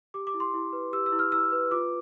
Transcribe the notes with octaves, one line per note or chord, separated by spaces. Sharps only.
G4 D6
D6
E4
C6
E4
B4
G4 E6
E6
E4
F6
E4 E6
B4
F4 D6